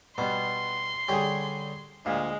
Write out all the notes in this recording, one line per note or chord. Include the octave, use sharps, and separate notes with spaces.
B2 G3 B3 C6
D3 G3 C#4 G4 G#4
D2 A#2 G#3 F5